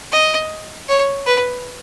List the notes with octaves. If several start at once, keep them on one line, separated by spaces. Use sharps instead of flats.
D#5
C#5
B4